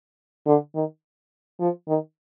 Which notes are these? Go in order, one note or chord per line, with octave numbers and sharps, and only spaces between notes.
D3
D#3
F3
D#3